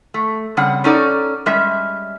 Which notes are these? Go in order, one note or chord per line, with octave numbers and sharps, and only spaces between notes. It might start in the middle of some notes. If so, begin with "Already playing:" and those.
A3
C#3 G3 C4 F#5
C#4 D#4 A4 D5
G3 G#3 C#4 E5